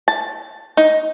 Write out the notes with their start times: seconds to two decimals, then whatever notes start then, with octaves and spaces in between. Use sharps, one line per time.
0.08 A5
0.77 D#4